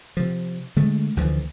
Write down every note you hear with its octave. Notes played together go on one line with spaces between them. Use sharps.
C3 F3
D3 G#3 A3
D2 D3 E3 F3